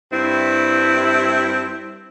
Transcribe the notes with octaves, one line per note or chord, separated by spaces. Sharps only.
G2 C4 E4